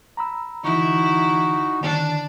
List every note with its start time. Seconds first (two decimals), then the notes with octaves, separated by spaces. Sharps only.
0.17 A#5 B5 E6
0.64 D3 E3 D#4 E4 F#4
1.81 D3 D#3 D4